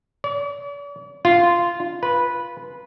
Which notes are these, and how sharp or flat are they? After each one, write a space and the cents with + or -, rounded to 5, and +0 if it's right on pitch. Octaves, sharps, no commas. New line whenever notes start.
D5 -45
F4 -10
B4 -10